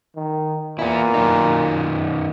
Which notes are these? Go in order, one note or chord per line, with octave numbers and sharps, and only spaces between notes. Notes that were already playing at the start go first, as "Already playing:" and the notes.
D#3
A#2 B3 E4
F#2 D#3 D#4